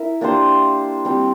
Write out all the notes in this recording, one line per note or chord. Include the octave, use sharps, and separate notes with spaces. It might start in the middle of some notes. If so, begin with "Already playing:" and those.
Already playing: E4 A#4 E5
A#3 D4 G4 C5
G3 C4 G4